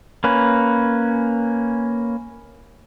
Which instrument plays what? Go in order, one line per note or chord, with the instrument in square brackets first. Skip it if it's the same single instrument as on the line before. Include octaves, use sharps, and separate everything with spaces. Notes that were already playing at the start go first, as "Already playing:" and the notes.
[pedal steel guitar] A#3 C#4 B4